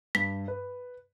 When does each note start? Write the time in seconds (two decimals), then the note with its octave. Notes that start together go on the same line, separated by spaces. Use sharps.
0.15 G2 B6
0.48 B4